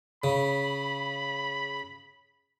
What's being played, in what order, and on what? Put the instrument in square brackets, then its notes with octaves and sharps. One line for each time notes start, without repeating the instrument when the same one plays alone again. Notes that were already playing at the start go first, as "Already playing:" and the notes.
[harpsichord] C#3 [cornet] B5